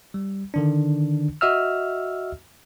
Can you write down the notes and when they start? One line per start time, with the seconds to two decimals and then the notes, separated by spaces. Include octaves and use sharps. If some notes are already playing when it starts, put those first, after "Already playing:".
0.14 G3
0.54 D3 D#3 D4
1.41 F#4 D#5 E5 E6 F6